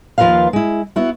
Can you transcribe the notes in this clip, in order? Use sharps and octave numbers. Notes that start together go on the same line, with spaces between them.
D#2 F3 F4 A#4 B4 F5
G#3 E4
B3 E4 F#4